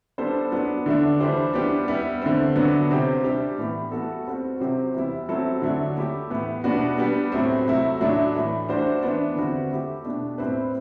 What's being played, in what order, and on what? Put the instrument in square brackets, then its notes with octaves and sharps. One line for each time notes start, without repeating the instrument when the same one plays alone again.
[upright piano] G3 B3 D4 A4 C5
F#3 B3 D4
D3 A3 D4
E3 G3 D4 G4 C5
G3 B3 D4 G4
G3 B3 E4
D3 A3 C4
D3 F#3 B3 D4 F#4
C3 G3 C4 G4
G3 D4 G4
A2 E3 B3
G3 B3 F#4 A4
G3 C4 F#4
C3 F#3 C4 G4
E3 G3 B3 E4
F#3 A3 C4 E4 A4
D3 F#3 A3 D4
A3 E4 G4
A2 E3 B3
B2 G3 B3 D4 F#4
G3 B3 D4 G4
A2 F#3 A3 C4
C3 F#3 A3 E4
A2 F#3 A3 D4
A2 E3 A3
G3 D4 F#4 C5
E3 B3 D4
D3 G3 C4 F#4
A3 E4 G4
B2 A3 D4
A2 G3 C4 E4 B4